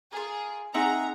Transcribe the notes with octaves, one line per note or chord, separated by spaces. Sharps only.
F4 G#4 A#4
C4 D#4 G#4 E5 F#5 A#5